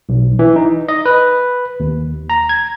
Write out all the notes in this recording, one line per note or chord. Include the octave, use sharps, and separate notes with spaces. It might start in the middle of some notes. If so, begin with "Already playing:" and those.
B1
E3
D#4
D#5
B4
D#2
A#5
G#6